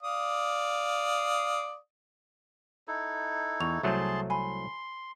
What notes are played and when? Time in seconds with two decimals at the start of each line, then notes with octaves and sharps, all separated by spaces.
0.03 D5 F5 D#6
2.88 D#4 E4 A4
3.60 E2 C#6 F7
3.83 C2 F#3 A3 G#4 E5 A5 C6 G6
4.30 G#5 B5 C6